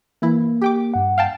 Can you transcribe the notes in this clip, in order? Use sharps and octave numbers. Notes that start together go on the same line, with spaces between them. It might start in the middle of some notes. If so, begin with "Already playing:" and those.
E3 A#3 E4
G4 G5 D6
G2 F#5
F5 G5 A5